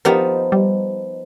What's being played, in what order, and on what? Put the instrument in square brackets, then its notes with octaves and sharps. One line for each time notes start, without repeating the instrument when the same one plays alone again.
[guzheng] F3 B3 D#4 [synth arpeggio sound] G4 A#4
[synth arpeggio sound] G3